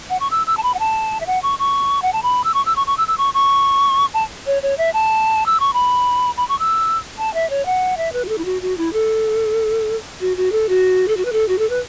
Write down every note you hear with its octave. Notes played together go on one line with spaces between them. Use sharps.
F#5
C#6
E6
E6
A5
B5
F#5
A5
E5
F#5
C#6
C#6
F#5
A5
B5
E6
C#6
E6
C#6
C#6
E6
E6
C#6
C#6
A5
C#5
C#5
E5
A5
E6
C#6
B5
B5
C#6
E6
A5
E5
C#5
F#5
E5
B4
F#4
A4
E4
F#4
F#4
E4
A4
F#4
F#4
A4
F#4
A4
F#4
B4
A4
F#4
A4
B4